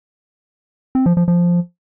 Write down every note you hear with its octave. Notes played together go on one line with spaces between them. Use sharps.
C4
F3
F3
F3